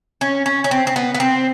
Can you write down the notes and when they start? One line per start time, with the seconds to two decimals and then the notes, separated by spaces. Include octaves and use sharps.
0.21 C#4
0.46 C#4
0.64 C#4
0.71 C4
0.87 C4
0.96 B3
1.15 B3
1.20 C4